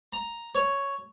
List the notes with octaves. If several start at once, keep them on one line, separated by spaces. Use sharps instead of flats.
A#5
C#5